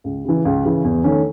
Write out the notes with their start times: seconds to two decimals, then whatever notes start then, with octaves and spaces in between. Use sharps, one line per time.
0.04 C#2
0.25 C#3 E3
0.45 C#2
0.64 C#3 E3
0.84 E2
1.04 D#3 A3 C#4